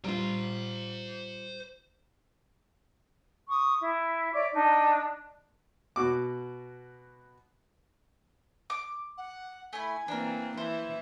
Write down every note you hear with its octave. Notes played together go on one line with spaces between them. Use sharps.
G3 F4 C5 A#5
C#6 D#6
E4
C#5 D5 E5 D6
D4 D#4
B2 F#4 D6
D6
F#5
A3 E4 G#5
E3 A#3 C4 D4 A#4
E3 E4 C5 E5